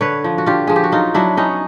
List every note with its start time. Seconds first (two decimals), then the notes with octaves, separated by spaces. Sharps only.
0.01 D3 B4 C#5
0.24 F3
0.38 F#4
0.46 D3 F4 G4
0.67 F3 G#4
0.76 G4
0.84 F#4
0.92 F#3 D#4 F4
1.14 F#3 D4 E4
1.37 B3 C#4 D#4